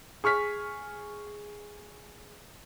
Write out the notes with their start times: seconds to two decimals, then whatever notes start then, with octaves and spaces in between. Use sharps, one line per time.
0.24 G#4 C#6 F6 B6